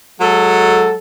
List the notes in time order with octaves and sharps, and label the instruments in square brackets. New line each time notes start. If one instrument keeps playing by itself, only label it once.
[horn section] F#3 G#3 A4